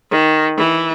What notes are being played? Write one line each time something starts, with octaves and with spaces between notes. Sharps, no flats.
D#3
E3